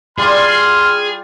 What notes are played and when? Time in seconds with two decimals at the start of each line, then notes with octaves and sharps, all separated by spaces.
0.18 G3 F4 G#4 C6 F6